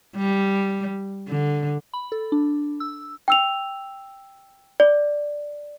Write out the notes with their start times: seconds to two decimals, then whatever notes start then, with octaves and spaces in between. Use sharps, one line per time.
0.16 G3
1.29 D3
1.94 B5
2.12 A4
2.32 D4
2.80 E6
3.28 G5 E6 F7
4.80 D5